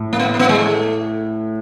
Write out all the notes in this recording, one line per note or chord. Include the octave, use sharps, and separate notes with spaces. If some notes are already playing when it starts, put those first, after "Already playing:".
Already playing: A2
A#3
B3
A#3
B3
G#3
A3